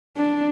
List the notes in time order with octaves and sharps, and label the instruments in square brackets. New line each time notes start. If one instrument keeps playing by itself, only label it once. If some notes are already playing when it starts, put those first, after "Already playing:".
[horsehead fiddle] D4